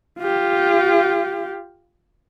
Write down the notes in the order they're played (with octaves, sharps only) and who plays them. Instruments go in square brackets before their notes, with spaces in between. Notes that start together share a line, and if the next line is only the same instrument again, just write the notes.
[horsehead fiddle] F4 G4